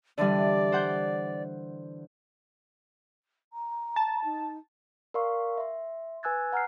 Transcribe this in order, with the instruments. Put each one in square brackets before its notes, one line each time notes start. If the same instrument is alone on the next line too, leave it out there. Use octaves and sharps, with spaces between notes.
[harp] D3 E3 G3 [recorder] D5
[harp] C5 F#5 G6
[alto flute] A#5
[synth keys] A5
[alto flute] D#4
[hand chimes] A#4 D5 F5 C6 C#6
E5 C6
B4 G#5 E6 F#6 G#6 A6
F#5 A#5 F6 F#6 C7